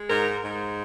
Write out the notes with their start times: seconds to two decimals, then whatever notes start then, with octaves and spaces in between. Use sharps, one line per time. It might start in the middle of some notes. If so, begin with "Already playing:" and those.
Already playing: G#3
0.10 G#2 A#4
0.43 G#2